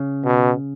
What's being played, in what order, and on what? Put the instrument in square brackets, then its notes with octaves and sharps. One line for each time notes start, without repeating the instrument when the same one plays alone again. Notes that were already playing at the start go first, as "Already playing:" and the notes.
Already playing: [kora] C#3
[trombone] B2